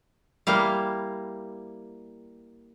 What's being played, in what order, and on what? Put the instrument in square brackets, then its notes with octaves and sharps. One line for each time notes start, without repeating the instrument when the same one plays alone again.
[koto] G3 A#3 E4 F5